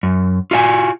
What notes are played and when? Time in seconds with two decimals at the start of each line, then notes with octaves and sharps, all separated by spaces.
0.03 F#2
0.51 F4 F#4 D#5 G#5